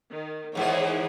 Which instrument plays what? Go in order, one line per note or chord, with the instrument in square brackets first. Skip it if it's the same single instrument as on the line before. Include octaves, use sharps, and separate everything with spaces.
[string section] D#3
[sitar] E2 G#2 E3 [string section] D#3 G#4 C#5